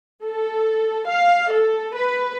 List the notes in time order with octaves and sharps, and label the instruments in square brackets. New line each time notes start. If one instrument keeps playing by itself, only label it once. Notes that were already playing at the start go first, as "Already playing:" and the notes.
[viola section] A4
F5
A4
B4